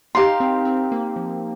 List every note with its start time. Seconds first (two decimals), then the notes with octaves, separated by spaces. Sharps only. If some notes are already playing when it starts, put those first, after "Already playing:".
0.15 D#4 G4 A#4 F5 C6
0.40 C4
0.65 C4
0.92 A#3
1.16 F3